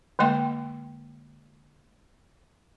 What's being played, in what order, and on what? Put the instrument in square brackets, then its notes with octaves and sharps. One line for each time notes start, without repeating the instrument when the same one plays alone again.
[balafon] D3 G#3 A#3 D#5 G5 C6